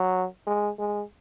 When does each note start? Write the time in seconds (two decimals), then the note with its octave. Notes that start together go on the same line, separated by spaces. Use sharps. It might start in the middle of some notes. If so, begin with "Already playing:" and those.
Already playing: F#3
0.47 G#3
0.79 G#3